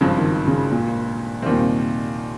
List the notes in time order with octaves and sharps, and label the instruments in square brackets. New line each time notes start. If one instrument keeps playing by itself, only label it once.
[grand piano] G#1 G2 F3 C4 [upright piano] C#3
[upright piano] D#3
C#3
A#2
[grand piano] D#2 D#3 G3 C4 [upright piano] C3
[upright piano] A#2
C3